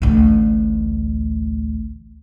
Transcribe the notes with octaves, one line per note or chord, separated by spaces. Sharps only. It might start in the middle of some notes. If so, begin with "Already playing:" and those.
A1 D2